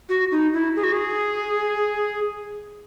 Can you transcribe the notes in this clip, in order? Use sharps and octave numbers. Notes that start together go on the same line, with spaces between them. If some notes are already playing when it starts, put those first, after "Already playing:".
F#4
D#4
E4
G#4
F#4
G#4